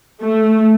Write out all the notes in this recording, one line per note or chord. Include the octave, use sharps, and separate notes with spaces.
A3